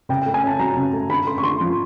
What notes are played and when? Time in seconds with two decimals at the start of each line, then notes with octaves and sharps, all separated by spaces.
0.09 C#3 G5
0.22 G5
0.26 A3
0.34 G#5
0.43 C#4 A5
0.59 F#3 A#5
0.77 C#3
0.93 A3
1.09 D3 B5
1.27 A3 C6
1.38 C#6
1.43 D3 C6
1.61 F3